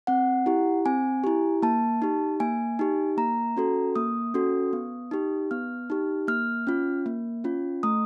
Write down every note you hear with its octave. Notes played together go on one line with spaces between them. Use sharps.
C4 F#5
E4 G4
C4 G#5
E4 G4
A#3 A5
D#4 G4
A#3 G#5
D#4 G4
A#3 A#5
C#4 F#4 A4
A#3 D#6
C#4 F#4 A4
B3
D#4 G4
B3 F6
D#4 G4
A#3 F6
C#4 F4
A#3
C#4 F4
A3 D#6